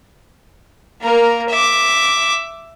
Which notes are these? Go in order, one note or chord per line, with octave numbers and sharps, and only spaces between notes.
A#3 A#4
E5 D6